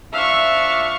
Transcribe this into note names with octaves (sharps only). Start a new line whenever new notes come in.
F3 D4 E5 F5 C#6